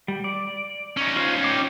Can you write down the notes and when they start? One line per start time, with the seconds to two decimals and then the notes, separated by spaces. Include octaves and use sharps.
0.08 G3
0.24 D5
0.97 C#4 D#4
1.16 F4 C5 F5
1.44 G5 D6